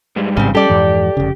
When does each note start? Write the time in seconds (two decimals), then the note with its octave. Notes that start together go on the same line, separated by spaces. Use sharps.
0.16 G2 G3 G#3
0.37 A1 G#2 C#3 C4 C#4
0.55 G3 C#4 G4 A4 D5
0.70 F2 G#2 E3
1.17 F1 C#3